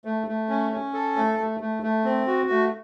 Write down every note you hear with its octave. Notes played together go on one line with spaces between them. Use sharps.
A3
A3
C#4
C#4
A4
A3
A3
A3
A3
C4
F#4
A3